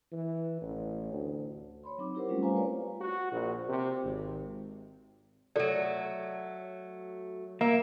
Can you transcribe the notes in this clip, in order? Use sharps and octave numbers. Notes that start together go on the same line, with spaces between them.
E3
A1
D2
C#5 B5 C6
F#3 C4 D#4 D6
E4 G4 A#4 C5 F#5
G3 A3 C4 C#4 F4
B4 C5 F5 G#5 A#5
G#3 F4 B4 C#5 D5 F5
F#4
A#1
C3
G#1
F#3 A3 A4 D5
A#3 E5